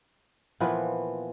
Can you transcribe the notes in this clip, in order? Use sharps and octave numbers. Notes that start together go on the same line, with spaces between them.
A#2 E3 F3 B3